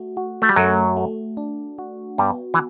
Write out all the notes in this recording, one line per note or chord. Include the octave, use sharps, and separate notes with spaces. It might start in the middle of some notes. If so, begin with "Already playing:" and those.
Already playing: A3 F#4
F#4
A3
G3
F#2 F#3 A3
A3
D4
F#4
G2 G3 B3
E3